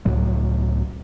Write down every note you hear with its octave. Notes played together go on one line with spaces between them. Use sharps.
C#2 A2 F#3 A3